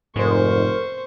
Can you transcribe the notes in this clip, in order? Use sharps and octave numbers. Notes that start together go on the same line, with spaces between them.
F1 G#2 A#4 C5 C#6